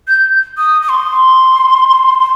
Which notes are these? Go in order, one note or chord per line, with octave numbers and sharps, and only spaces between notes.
G6
D#6
D#6
C6
C6